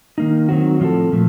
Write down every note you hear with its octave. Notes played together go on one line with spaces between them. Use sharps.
D#3 A#3 D#4
D#3 F#3 A3 C4 F#4
A2 F3 C4 F4 A4
A#2 F3 A3